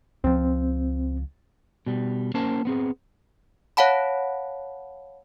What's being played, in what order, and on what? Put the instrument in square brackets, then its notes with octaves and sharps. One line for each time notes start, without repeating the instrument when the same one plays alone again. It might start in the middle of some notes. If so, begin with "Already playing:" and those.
[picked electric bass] C#2 F3 [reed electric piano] C4
[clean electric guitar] B2 G3
A#3 C#4 A#4 C5 A5
B3 C4 G#4
[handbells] C#5 F5 F#5 A5 B5